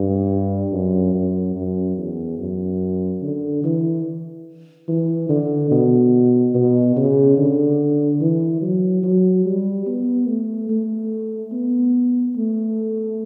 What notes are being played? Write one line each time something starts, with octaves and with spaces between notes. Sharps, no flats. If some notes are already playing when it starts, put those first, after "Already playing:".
Already playing: G2
F#2
F#2
F#2
E2
F#2
D3
E3
E3
D3
B2
B2
C#3
D3
E3
F#3
F#3
G3
B3
A3
A3
B3
A3